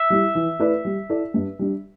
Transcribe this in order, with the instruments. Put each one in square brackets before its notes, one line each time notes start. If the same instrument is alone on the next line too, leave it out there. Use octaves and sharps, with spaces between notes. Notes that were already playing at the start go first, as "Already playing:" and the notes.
Already playing: [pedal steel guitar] E5
[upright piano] G3 E4
E3
A3 E4 B4 D5
G3
E4 A4 D5
G2
G3 D4